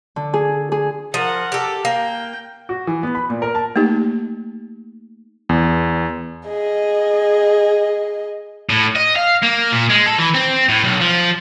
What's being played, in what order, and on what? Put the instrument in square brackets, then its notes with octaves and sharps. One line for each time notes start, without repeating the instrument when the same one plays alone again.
[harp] D3
G#4
G#4
[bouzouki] F3 [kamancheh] A#4 F#5
[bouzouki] G4 A4
[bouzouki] A#3 [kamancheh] G5
[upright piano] F#4
E3
B3
B5
A#2
A#4
A5
[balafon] A3 A#3 D#4 G4
[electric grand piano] E2
[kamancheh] G#4 D#5
[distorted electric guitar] A2
D#5
F5
A#3
A#2
G#3
A4
E3
C4
A2
B1
F3